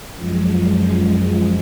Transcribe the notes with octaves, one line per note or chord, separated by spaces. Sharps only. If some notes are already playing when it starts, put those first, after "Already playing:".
F#2 F3 G#3